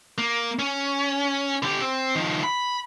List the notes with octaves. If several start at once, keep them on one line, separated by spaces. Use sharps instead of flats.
A#3
C#4
D3 G4
C4
D#3 F3
B5